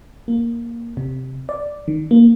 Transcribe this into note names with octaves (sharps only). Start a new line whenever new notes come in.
A#3
C3
D5
D#3
A#3